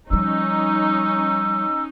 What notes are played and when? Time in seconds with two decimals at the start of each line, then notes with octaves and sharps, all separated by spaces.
0.11 F3 G3 C#4 D#4 E6